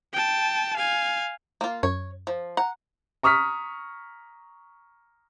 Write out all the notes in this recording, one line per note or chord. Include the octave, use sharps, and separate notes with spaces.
G5 A5
F5 G#5
A#3 F4
F#2 C#5
F3
F#5 A#5
A#5 C#6 D#6 F6 B6